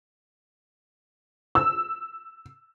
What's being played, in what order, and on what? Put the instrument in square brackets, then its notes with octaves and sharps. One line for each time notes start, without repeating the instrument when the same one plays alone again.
[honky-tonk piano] E6